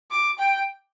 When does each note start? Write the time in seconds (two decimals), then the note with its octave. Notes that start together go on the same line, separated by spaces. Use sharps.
0.11 D6
0.38 G5